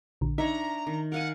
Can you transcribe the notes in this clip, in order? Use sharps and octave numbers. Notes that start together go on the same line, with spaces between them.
A#1 D3
D4 D#4 C#5 E5 A#5
D#3
A#4 F5 F#5 G#5